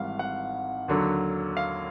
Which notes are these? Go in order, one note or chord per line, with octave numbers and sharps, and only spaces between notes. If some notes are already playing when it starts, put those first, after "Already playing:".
Already playing: G#1 G#2 E3 G3 F5 F#5
F#5
D#2 D3 F#3
F5